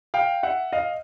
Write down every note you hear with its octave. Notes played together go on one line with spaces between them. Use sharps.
F5 G5
E5 F#5
D#5 F5